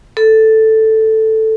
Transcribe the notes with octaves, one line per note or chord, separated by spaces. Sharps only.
A4